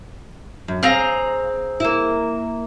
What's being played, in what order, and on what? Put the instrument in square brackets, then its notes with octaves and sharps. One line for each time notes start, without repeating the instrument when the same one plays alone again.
[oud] F#2
[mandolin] C4 G#4 A#5 [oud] F5
[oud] A#3 E4